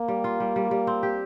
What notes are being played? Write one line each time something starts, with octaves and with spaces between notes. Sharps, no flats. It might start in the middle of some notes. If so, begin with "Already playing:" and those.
Already playing: A#3
G3
F4
G3
G3
G3
C4
G4